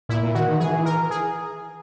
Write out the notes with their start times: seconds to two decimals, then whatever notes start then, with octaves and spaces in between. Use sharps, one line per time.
0.09 A#2 E4
0.23 A#2
0.35 D#3 F#4
0.48 D#3
0.60 E3 G#4
0.86 A#4
1.11 G#4